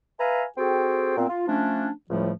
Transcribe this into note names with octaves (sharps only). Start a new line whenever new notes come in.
B4 E5 F5 G#5 A#5
C4 F#4 G#4 A4 G5
A#2 B3 C4
F4
F3 A3 C#4 D4
C#2 A2 F3 G3 A3